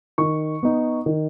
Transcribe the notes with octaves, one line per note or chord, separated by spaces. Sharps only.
D#3 C#6
B3 D#4
D#3